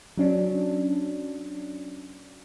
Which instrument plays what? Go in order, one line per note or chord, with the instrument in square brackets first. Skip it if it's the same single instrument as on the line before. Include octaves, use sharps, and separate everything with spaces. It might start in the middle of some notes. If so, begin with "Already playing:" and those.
[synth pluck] F#3 C#4 D4